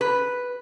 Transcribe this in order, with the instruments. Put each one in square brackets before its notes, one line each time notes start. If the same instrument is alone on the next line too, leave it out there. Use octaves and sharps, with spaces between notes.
[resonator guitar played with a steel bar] B4